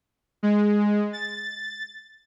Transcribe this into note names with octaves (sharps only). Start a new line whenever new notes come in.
G#3
A6